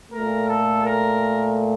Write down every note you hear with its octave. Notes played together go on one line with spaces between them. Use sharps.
A#2 A3 A#4
A4
A#4